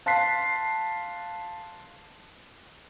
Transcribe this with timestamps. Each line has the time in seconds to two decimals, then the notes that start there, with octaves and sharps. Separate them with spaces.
0.06 F5 A5 C6 F#6 B6 C7